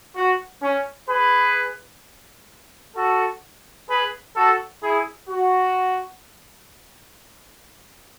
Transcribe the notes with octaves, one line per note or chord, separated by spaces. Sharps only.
F#4
C#4
G#4 B4
F#4 A4
G#4 B4
F#4 A4
E4 G#4
F#4